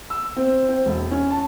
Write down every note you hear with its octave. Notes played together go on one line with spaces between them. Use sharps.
E6
C4
C4
E1
C#4
A5